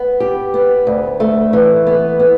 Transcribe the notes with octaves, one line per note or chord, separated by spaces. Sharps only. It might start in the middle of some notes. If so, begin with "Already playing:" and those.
Already playing: B3
G4
B3
D2
A3
E3
B3
B3